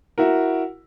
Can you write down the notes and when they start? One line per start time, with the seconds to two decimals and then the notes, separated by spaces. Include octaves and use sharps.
0.18 E4 F#4 A#4